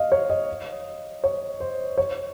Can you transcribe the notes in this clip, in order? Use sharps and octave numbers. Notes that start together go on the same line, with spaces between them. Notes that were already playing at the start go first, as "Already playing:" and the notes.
Already playing: D#5 F5
C#5
D#5
C#5
C5
C#5